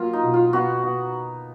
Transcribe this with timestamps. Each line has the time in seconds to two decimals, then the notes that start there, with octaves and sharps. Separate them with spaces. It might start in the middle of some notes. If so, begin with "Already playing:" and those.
Already playing: F#3 A#3 F4
0.13 D#4
0.23 B2
0.34 F4
0.53 B3 F#4
0.83 B3